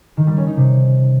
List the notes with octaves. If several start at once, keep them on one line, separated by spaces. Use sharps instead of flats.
D#3
G3
C#4
D#4
C3